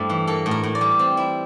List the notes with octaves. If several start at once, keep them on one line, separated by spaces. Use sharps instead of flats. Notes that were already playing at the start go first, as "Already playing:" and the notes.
Already playing: G2 A3 E4 C5
E3
A#3 A4
A2
A#4
A2
D5
G3
C4
E4